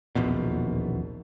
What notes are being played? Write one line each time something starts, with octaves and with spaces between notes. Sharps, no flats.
D#1 A#1 E2 B2